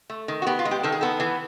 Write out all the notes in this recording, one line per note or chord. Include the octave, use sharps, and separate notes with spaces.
A3
D#3
F#4
B3 G4
F4
G#3
G4
D#3 A4
G#4
B3 A4
E3